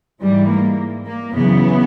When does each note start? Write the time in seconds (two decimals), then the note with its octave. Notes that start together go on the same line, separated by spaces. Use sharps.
0.22 G#2 E3 G3
0.50 A#3
1.07 A#3
1.35 F#2 C#3 E3 B3